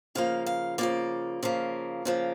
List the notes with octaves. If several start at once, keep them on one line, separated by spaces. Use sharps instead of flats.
C#3 F3 A#3 F5
F5
C#3 F3 A#3 D5
C#3 F3 A#3
C#3 F3 A#3